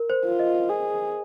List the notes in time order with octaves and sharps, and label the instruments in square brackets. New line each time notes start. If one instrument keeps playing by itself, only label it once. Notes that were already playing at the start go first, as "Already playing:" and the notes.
Already playing: [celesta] A#4
C5
[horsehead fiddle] F4
[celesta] D#5
[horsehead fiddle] G#4